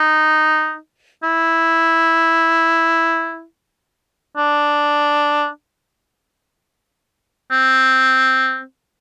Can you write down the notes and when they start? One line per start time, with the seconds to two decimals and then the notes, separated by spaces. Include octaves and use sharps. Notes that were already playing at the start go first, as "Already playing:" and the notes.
Already playing: D#4
1.23 E4
4.37 D4
7.51 C4